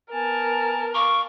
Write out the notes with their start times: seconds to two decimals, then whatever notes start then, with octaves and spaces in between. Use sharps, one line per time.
0.13 B3 A#4 G#5 A5
0.95 F5 C#6 D6